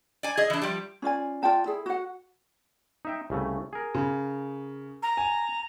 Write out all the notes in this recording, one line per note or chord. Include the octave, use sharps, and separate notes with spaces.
D5 G#5
G#4 D#5
E3 D4
F3 G3
C#4 F4 D5 G#5
F4 D5 G5 A5
E4 G#4
F#4 F#5
D#4 E5 G5
C2 C#3 A3
G#4 A#4
C#3
A#5
G#5